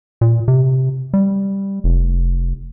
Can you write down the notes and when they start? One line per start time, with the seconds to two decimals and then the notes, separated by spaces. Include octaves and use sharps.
0.21 A#2
0.48 C3
1.13 G3
1.84 F1